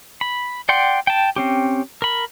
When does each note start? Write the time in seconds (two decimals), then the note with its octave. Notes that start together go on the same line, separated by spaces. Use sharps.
0.21 B5
0.69 D5 F#5 G5 C6
1.07 G5 A5
1.36 C4 C#4 G4
2.02 A#4 B5